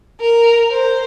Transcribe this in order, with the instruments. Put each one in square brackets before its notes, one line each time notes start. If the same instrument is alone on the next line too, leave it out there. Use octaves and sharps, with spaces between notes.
[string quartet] A#4
C5